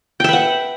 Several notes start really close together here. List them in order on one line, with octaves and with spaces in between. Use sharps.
G5 E5 B4 F#5